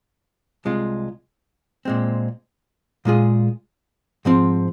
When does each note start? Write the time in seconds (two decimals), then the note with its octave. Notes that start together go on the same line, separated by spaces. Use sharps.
0.65 C2 C3 G#3 F4
1.85 A#2 G#3 C4
3.05 A#2 G#3 F4 G#4
4.25 G#2 F3 C4